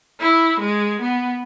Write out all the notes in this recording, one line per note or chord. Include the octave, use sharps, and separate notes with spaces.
E4
G#3
B3